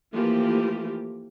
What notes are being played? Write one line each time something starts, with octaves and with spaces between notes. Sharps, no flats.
E3 F3 A3 A#3 F4 G4